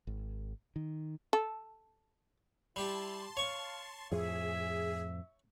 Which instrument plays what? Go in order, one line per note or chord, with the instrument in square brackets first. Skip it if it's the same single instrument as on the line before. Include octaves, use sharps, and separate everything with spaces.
[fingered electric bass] G#1
D#3
[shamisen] A4
[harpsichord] G3 G4 [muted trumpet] E4 [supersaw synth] A5 C6
[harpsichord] C#5 C#6 [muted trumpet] F5
[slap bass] F2 A2 F3 [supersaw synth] G#4 [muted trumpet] E5